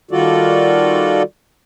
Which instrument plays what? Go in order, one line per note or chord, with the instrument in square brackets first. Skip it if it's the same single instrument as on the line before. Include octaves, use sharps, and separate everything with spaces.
[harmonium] D#3 G3 F4 F#4 A4 D5